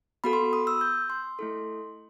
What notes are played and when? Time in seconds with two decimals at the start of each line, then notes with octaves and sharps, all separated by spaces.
0.24 B3 F#4 A4 B5
0.33 C6
0.53 D#6
0.67 E6
0.81 G6
1.10 C6
1.39 A3 E4 A4